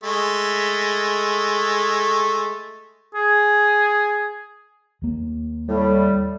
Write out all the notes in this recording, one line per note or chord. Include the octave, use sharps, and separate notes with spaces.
G#3 A3
G#4
D#2 A#3
A2 G3